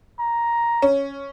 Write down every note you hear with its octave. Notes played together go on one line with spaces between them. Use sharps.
A#5
C#4